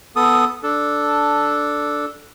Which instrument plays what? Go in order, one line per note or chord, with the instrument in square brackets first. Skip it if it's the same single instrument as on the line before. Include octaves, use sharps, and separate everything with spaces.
[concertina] B3 A4 D#6
D4 A4